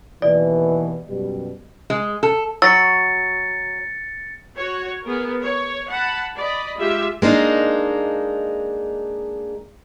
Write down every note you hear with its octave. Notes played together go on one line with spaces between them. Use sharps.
D#2 B2 E3 D5
F#2 B2 G3
G#3
A4
F#3 E6 A6 A#6 C#7
F#4 C#5
B3 G#4 A#4
C#5
F#5 A5 B5
D5 D#5 B5
G#3 F4 G4 E5
G#3 A#3 D4 D#4